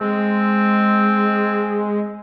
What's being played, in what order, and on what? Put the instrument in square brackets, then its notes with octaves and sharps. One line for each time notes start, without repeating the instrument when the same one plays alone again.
[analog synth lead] G#3 [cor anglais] C4